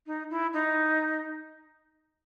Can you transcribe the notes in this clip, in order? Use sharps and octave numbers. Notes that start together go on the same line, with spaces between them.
D#4
E4
D#4